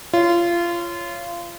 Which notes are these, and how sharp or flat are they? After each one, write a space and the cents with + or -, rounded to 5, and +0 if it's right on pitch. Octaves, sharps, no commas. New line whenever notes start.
F4 -25 C#5 +0